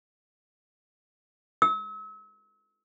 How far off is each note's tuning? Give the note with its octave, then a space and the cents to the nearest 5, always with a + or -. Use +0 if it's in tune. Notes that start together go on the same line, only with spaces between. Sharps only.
E6 -40